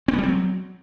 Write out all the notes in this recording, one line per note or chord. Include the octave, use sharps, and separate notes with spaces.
C4
B3
G3
C4
F#3